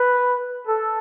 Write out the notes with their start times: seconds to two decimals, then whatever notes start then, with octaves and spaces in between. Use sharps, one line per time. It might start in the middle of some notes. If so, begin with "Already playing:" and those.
Already playing: B4
0.67 A4